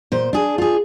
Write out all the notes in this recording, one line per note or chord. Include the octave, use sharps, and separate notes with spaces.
A#2 C5
D4 G#4
F4 G#4